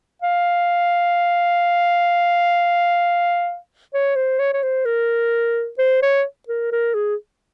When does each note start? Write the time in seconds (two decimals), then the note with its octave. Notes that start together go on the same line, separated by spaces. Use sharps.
0.22 F5
3.94 C#5
4.16 C5
4.39 C#5
4.53 C#5
4.63 C5
4.85 A#4
5.78 C5
6.03 C#5
6.48 A#4
6.72 A#4
6.94 G#4